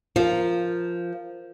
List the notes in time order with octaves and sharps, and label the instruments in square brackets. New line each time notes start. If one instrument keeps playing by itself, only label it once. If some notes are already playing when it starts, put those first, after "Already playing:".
[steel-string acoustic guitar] F3 [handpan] F4 A#4